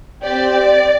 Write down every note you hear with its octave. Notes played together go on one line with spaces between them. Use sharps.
C4 G4 D5